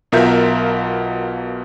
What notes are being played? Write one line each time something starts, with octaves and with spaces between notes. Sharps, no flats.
B1 B2 F4 A#4 E5 G6